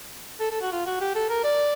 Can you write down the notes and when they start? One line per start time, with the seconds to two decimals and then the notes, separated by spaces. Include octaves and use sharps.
0.40 A4
0.51 A4
0.61 F#4
0.72 F4
0.87 F#4
1.01 G4
1.15 A4
1.30 A#4
1.44 D5